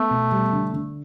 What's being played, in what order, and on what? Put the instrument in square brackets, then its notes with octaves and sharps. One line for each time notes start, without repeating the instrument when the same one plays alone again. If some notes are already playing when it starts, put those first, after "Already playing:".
Already playing: [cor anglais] A3 [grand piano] B3
[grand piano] B2
G3
D3
D3